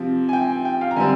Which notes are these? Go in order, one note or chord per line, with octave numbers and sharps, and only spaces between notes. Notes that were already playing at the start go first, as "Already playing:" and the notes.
Already playing: C3 F3 C4
G#5
G5
G5
F5
A#5
D3 G3 C4 G#5